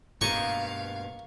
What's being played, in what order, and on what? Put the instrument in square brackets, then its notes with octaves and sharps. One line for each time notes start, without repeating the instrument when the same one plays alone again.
[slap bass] G2 B2 [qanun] A#3 D#5 A5 [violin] F5 [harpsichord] C#6